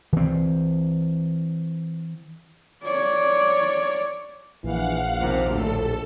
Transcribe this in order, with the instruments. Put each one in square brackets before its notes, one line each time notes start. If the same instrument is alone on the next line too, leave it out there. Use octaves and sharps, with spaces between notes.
[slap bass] E3 C4
[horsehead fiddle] C#5 D5
[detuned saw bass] A#1 [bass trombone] E3 [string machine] F5 F#5
[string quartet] D#2 C3 A#3 [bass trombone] F3
[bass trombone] D2 [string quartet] A2 [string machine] A4